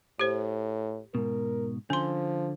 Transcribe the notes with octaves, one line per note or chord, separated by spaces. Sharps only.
A2 G4 C5
G#2 B2 A#4
D3 F3 C#4 C6